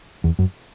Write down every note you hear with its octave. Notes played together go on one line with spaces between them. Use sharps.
E2
F#2